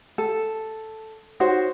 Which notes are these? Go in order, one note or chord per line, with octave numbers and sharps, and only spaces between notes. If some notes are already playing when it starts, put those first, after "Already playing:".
A4
D#4 F#4 C5 C#5